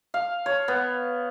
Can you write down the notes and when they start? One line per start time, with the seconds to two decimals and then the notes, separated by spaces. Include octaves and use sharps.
0.14 F5
0.46 C#5
0.68 B3